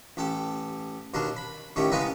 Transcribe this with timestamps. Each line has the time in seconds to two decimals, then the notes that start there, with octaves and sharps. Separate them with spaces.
0.17 A1 G4 A4
1.14 D#2 B2 D4 A#4 C6
1.36 B5
1.76 A1 D#3 A3 G4 C#5
1.92 C#3 G#3 B3 E4 A#4 B4